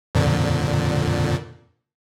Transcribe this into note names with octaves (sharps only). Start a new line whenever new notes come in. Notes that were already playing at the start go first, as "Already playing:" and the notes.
F2 A#2 D3